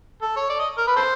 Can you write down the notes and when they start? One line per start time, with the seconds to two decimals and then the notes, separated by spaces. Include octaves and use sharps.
0.22 A4
0.36 C#5
0.49 D5
0.59 D#5
0.78 A#4
0.87 B4
0.96 A4 C5